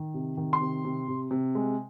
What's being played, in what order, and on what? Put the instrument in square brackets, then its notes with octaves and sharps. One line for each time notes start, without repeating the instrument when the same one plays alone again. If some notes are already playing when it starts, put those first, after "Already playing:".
Already playing: [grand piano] D#3
C3
D#3
C6
C3
C3
C3
C3
G#3